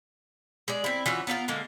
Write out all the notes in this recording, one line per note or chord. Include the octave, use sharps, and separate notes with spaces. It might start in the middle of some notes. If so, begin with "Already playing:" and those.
G#3 G#4 D5
C4 E4
E3 C#4 F4 F#4
B3 D4 F4 A#4
D3 G#3 A#3